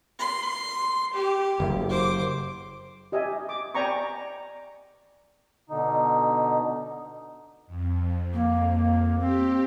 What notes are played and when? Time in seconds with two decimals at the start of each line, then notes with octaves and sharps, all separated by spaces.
0.19 C6
1.13 G4
1.60 F#1
1.89 C5 D6
3.12 G4 D#5 E5 G#5
3.49 D6
3.75 D5 G5 G#5 A#5 B5 C#6
5.70 B2 D3 D#4
7.66 F2
8.34 A#3
9.20 C4 G4